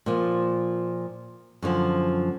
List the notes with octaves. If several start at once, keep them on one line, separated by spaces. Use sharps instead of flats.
A#2 F3
F#2 D3 F3